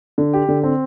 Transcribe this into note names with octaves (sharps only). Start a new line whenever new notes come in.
D3
G4
D3
C4